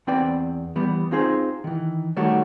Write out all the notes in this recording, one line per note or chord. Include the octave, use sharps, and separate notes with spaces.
E2 C4 B4 D5 G5 B5
E3 G3 B3
C4 D#4 F4 G#4 C5
D#3 E3
D#3 G3 A3 F#4 C#5